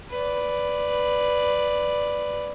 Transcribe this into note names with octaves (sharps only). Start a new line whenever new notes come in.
B4 D5